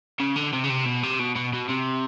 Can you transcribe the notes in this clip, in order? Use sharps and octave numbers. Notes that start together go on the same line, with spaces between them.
C#3
D3
C3
C#3
C3
B2
C3
B2
B2
B2
C3